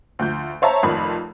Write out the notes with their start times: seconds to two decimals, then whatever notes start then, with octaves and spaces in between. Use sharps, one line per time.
0.19 D2 F3 G6
0.62 C5 C#5 E5 A5 A#5
0.83 F1 F2 D#3 B5